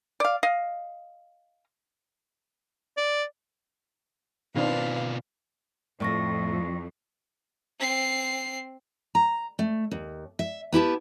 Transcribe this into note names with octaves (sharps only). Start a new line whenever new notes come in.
D5 F5
D#5 F5
D5
B2 D#3 C4 D4 F4 B4 F5
F2 A2 D5 C#6 A#6
C4 C7
A#5
A3
D#2
E5
B3 E4 G4 A5